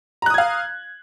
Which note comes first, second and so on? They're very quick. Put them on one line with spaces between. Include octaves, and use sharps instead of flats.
A#5 F#6 D#6 G#6 F5